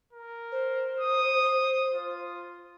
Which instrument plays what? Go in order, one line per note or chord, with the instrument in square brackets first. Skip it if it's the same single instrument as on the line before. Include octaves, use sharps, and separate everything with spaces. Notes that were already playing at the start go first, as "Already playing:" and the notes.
[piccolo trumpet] A#4
[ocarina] C5
[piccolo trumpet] D#6
F4